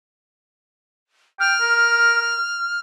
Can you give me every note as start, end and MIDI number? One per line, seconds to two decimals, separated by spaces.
1.40 1.55 79
1.40 2.80 89
1.61 2.37 70